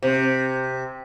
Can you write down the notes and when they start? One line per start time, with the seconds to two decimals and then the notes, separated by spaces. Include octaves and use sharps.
0.03 C3